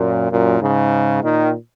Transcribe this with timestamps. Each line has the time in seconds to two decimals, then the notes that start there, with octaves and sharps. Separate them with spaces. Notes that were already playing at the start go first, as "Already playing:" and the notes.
Already playing: F#2 A#2
0.30 F#2 A#2
0.60 G#2 C#3
1.22 A#2 D#3